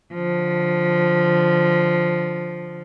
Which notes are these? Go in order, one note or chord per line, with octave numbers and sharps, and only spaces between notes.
D3 F3